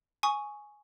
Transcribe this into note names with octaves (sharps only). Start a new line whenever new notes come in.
G#5 C#6 D#6